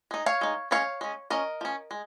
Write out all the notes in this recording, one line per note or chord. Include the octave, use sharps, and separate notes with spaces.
G#3 D#4
C#5 F5
G#3 D#4
G#3 C#4 C#5 F5
G#3 C#4
F3 C#4 A#4 D#5
F3 C#4
G#3